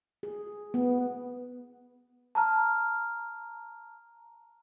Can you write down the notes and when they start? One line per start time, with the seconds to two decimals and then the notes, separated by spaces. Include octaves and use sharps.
0.23 G#4
0.74 B3
2.35 A5 A#5 F6